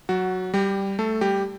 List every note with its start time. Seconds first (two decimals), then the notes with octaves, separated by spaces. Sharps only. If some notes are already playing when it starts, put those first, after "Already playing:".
0.09 F#3 F#4
0.54 G3 G4
0.99 A3 A4
1.21 G3 G4